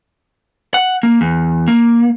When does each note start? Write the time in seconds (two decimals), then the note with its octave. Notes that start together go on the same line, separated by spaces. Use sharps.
0.74 F#5
1.03 A#3
1.21 E2
1.68 A#3